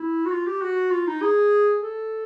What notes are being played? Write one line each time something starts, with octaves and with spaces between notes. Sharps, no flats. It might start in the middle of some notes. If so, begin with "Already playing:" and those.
Already playing: E4
F#4
F4
G4
F#4
F4
D#4
G#4
A4